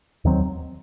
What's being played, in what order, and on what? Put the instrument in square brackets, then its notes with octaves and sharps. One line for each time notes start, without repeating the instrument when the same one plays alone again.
[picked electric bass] D#2 D#3 F#3 C4